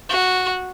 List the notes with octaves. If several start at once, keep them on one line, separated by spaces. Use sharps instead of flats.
F#4